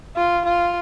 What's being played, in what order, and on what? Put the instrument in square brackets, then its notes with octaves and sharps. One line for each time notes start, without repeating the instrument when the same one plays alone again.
[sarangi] F4
F4